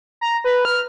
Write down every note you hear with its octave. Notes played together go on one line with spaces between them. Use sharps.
A#5
B4
F6